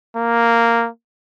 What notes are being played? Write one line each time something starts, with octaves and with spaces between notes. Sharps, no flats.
A#3